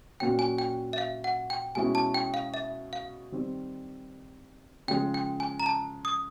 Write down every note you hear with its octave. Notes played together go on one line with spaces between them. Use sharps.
A#2 F#3 A#3 C#4 F#4 G5
G#5
G5
E5
F5
F#5
G5
B2 G#3 C#4 E4 G#5
A5
G5
F5
E5
F5
D#3 G3 C4
C#3 F3 G#3 G5
G5
G#5
A#5
A5
D#6